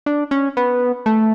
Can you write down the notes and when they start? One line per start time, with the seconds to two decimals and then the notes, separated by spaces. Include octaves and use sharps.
0.06 D4
0.31 C#4
0.57 B3
1.06 A3